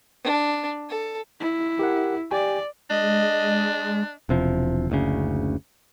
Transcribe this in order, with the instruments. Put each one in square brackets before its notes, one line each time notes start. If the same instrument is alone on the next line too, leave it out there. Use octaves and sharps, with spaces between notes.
[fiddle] D4
A4
[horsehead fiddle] E4
[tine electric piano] G4 A#4 F#5
[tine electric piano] G4 G5 G#5 [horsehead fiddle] D5
[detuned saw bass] G#3 [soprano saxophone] D4 [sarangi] D#5
[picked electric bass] E1 C3 F3
F#1 D2 C#3